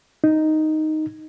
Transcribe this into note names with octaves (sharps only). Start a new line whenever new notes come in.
D#4